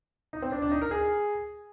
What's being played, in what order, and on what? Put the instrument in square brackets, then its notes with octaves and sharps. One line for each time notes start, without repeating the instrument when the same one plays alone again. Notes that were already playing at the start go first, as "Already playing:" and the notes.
[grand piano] D#4
C4
D4
D4
D#4
A#4
G#4